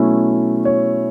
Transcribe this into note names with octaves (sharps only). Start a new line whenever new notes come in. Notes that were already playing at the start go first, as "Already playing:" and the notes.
Already playing: B2 F#3 A3 C#4 E4 C#5
C#5